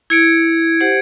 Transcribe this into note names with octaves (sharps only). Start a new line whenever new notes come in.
E4 G#6 C#7 D7
G4 C5 F#5